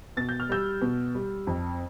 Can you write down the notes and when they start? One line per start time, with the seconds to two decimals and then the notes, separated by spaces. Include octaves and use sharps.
0.17 B2 A6
0.29 G6
0.40 F6
0.49 G3 E6 G6
0.82 B2
1.15 G3
1.47 F2